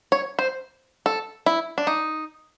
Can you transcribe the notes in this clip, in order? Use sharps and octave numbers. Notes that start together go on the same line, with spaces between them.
C#5
C5
A4
E4
D4
D#4